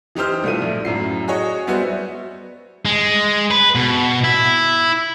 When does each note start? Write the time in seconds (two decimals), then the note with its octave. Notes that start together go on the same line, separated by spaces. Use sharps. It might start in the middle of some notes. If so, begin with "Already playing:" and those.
0.15 E3 D#4 G4 C5 F6
0.44 C2 B2 A3 F4 D#7
0.62 A#1
0.85 F#2 A2 C7
1.28 F#4 G#4 C#5 D#5
1.67 G3 B3 E4 F#4 C5
2.85 G#3
3.51 B4
3.75 B2
4.24 E4